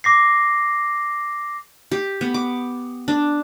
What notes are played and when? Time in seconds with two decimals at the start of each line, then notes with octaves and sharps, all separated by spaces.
0.04 D6 A#6 C7
1.92 G4
2.21 B3
2.34 D6
3.08 D4